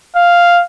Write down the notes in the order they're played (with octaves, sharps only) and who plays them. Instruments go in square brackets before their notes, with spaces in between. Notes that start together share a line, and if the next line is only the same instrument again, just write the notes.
[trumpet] F5